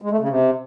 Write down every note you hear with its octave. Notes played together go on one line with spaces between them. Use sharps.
G#3
A3
C#3
C3